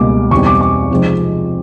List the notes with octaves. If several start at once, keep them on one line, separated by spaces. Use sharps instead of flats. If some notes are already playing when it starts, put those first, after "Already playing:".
Already playing: C#2 B2 G3 A#3 D6
E2 B2 G3 C4 D#4 C#6
D6
D6
C3 F3 G#3 C4 D#4